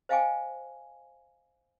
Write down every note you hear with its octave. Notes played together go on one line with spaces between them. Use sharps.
C5 D#5 F5 G5 G#5 D6